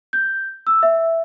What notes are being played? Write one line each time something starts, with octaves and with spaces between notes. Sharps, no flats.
G6
E6
E5